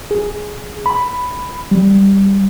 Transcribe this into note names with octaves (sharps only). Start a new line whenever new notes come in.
G#4
B5
G3